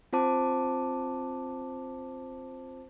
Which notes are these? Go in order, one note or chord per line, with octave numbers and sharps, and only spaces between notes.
C4 F4 C5 A5 D6